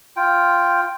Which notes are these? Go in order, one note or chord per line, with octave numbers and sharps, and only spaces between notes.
F4 G5